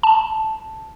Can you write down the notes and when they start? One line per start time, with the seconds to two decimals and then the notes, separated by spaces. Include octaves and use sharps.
0.03 A5